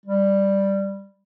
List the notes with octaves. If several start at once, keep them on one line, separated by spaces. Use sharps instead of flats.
G3